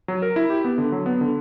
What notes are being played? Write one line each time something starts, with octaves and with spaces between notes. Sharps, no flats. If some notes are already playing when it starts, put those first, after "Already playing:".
F#3
A#4
E4
G4
B3
D3
F#3
B3
D3